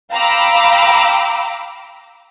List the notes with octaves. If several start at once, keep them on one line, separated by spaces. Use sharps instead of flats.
F5 G5 A#5 B5 D6 E6